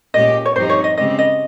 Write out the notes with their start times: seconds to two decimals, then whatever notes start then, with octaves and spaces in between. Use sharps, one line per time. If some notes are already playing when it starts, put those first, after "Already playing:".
0.14 A#2 G#3 C#4 G4 D#5
0.46 C#5
0.56 G2 F3 C4 D#4 G4 C5
0.70 C#5
0.84 D#5
0.98 C#3 G#3 C4 G4 D#5
1.19 D#5